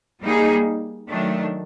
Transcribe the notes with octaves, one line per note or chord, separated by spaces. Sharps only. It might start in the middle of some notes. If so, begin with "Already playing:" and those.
G3 A#3 D#4 G#4
D#3 F#3 A3 D4